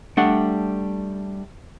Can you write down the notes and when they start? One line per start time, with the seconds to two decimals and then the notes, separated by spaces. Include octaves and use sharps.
0.17 G3 A3 D4 F#5